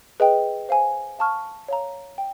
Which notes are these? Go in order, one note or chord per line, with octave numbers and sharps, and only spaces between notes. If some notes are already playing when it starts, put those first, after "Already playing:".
G#4 B4 D#5 G5
C5 F5 G#5
F5 A5 C#6 F6
C#5 F5 A#5
G5